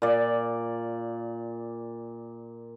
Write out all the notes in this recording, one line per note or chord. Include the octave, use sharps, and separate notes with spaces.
A#2 D5